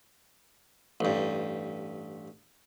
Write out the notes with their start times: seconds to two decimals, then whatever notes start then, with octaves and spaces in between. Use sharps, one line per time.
1.00 A1 G2